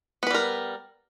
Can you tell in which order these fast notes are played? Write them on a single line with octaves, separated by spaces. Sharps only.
B3 B4 G3 A#4